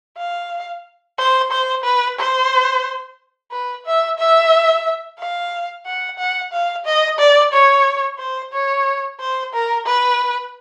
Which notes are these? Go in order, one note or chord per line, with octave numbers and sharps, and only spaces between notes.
F5
C5
C5
B4
C5
B4
E5
E5
F5
F#5
F#5
F5
D#5
D5
C#5
C5
C#5
C5
A#4
B4